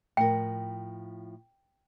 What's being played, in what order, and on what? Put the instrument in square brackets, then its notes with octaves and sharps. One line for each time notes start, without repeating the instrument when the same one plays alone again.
[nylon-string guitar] A2 F3 A#4 [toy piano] G5